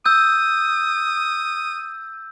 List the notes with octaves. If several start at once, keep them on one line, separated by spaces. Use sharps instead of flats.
D#6 E6 G6